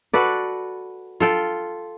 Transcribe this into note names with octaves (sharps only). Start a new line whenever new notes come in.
F#4 A4 B4 D5
F4 A4 G5